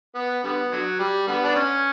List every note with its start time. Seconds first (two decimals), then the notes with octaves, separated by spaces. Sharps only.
0.15 B3
0.44 D3 G3 B3
0.72 D3 F#3
0.99 G3
1.27 D3 G3 B3
1.44 D4
1.56 C#4